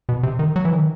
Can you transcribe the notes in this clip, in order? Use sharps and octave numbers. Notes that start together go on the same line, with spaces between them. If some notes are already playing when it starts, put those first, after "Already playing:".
B2
C3
D#3
F#3
E3
D#3